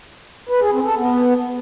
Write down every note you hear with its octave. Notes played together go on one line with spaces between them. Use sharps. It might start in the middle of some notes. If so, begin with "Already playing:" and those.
B4
G#4
C4
A4
B3